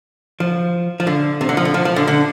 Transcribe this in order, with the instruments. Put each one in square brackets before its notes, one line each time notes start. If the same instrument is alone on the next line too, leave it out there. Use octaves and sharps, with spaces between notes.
[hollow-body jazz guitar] F3
F3
D3
C3
D3
F3
D3
F3
F3
D3
D3